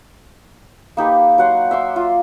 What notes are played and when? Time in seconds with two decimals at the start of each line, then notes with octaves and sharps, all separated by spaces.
0.97 A#3 D#4 G4 B4
1.38 F#3 F#5 C6
1.71 E5 C6 D6
1.96 F4